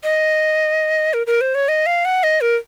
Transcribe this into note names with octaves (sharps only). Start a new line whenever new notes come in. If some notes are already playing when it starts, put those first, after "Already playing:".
D#5
A#4
A#4
C5
C#5
D#5
F5
F#5
D#5
A#4